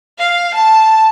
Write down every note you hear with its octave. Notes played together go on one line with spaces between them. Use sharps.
F5
A5